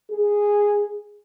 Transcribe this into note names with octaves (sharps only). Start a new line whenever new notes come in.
G#4